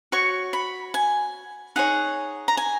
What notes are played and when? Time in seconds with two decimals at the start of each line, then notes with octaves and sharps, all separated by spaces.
0.12 F#4 C#5 C#6
0.53 B5
0.94 G#5
1.76 D#4 G#4 C#5 F#5
2.48 A#5
2.57 G#5